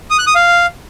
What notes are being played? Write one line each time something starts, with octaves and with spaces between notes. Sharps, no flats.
D#6
F#6
D#6
F5